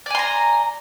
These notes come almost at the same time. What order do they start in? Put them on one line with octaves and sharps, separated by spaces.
D5 G#5 C6 A#5